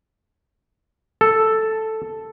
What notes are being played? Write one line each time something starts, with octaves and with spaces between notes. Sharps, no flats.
A4